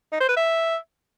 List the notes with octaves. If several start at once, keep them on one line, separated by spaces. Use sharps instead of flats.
D#4
C5
B4
E5